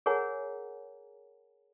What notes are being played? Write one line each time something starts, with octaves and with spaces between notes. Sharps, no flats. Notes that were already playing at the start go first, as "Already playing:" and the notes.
G#4 A#4 C#5 F#5 G#5 A#5